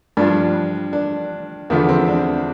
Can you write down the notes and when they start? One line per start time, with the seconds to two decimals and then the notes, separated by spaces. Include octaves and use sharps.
0.17 G2 F3 D4
0.93 D4
1.70 E2 D3 F3 B3
1.89 C4
2.08 D4